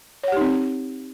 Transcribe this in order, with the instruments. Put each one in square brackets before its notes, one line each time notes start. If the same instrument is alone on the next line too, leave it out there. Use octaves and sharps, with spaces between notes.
[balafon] C#5
F#5
G4
D#4
C4